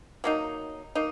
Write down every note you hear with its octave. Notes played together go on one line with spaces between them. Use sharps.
F#3 A#3 D#4
A#3 D#4